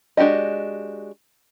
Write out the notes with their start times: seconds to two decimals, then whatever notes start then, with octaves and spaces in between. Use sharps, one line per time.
0.17 G#3 D4 F#4 G4 D#5